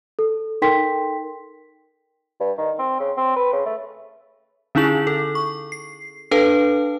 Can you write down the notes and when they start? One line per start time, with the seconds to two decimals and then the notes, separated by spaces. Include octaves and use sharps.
0.19 A4
0.62 D#4 A4 A#4 G5 C6 B6
2.40 G2
2.58 D#3
2.79 C4
3.00 C#3
3.17 C4
3.36 B4
3.53 C#3
3.66 A3
4.75 D3 C#4 D#4 E4 G#4 F#7
5.07 A4
5.35 C#6
5.72 C7
6.31 D4 A4 B4 F5 A5